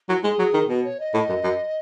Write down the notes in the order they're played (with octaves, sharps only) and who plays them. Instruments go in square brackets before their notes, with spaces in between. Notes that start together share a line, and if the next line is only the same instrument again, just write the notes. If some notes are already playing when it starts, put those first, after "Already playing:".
[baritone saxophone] F#3 [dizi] E4
[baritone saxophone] G#3 [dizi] G#4
[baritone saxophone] F#3
D#3
[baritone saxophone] B2 [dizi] B4
[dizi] C#5
D#5
[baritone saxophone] A2
F#2
F#2